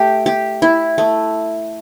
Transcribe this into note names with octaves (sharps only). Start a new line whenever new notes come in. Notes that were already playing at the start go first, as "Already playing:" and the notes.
Already playing: A3 G4
G4
E4
A3